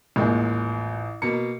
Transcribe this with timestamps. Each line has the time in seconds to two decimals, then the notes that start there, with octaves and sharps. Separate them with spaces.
0.16 A1 D#2 A#2 G#3
1.22 B2 A#3 C#7